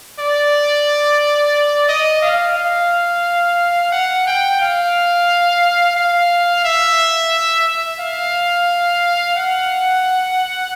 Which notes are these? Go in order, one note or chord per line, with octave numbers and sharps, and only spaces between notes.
D5
D#5
F5
F5
F#5
G5
F5
F5
E5
F5
F#5